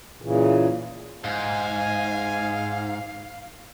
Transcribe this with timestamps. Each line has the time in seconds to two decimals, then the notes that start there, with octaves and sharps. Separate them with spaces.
0.22 A#2 C#3 E3
1.24 G#2 F5 G#5